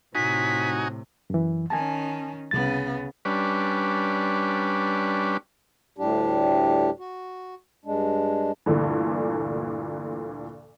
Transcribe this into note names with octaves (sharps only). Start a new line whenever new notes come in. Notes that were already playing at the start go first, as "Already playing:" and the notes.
A2 C3 D#4 F#4 G#5 B6
F#2 E3
D#3 C#4 G#5 A5
C2 C#3 B3 A6
G3 C#4 D4 B4
D2 A2 G3 D4 G4
F#4
G2 G#3 D4
D2 G2 A#2 D3 E3